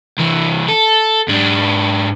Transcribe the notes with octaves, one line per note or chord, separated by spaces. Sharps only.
C2 E3
A4
G#2 D4